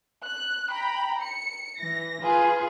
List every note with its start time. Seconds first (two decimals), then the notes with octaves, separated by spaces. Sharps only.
0.24 F#6
0.71 G5 A#5 B5
1.22 C#7
1.80 E3 A#6
2.23 F4 G#4 B4